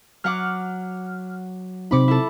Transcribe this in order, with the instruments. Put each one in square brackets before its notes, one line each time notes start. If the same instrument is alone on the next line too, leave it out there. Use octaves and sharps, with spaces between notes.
[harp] F#3 F#5 D6 [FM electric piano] F6
[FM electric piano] C3 C4 D#4 [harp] B5 D6
[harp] E4 A4